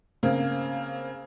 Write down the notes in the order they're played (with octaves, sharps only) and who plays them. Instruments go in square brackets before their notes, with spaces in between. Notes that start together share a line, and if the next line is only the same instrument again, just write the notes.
[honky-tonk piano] C#3 A#3 C4